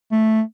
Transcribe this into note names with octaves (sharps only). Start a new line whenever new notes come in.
A3